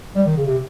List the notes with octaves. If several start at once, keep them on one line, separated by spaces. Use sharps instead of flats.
G3
D#3
C#3
C3